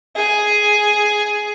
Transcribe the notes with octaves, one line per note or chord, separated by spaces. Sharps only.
G#4 G#5